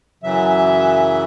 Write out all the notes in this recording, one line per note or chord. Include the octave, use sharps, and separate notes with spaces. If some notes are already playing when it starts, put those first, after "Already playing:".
F#2 C#3 E3 F#3 E5